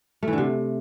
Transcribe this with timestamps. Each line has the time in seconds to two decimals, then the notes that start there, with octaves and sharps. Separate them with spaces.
0.23 A3
0.28 E3
0.33 D3
0.38 C3